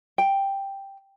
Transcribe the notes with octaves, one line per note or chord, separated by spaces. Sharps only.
G5